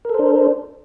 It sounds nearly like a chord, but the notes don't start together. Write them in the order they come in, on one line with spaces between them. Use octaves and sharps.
A#4 A4 C5 D4